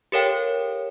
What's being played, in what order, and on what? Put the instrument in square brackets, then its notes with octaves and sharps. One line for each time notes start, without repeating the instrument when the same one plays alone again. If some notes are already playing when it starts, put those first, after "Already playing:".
[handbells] G4 A4 A#4 C#5 F5 G5